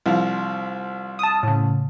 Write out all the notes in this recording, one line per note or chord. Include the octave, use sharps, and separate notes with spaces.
C2 F3
A5 D#6
A2 C#3